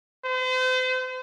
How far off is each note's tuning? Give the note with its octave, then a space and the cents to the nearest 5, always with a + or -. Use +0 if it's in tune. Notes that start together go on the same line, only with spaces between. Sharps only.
C5 -40